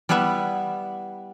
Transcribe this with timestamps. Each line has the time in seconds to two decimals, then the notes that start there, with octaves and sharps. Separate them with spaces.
0.09 G3 B3 E4 B4 E5 F#5